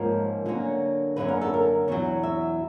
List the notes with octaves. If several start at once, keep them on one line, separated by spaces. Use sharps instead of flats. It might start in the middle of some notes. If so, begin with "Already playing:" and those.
Already playing: G#2 F3 A#3 C#4 A#4
D3 F#3 A#3 C#4
F#2 D3 F#3 A#3 C#4 B4
A#4
A4
A#4
E2 B2 F#3 C#5
E5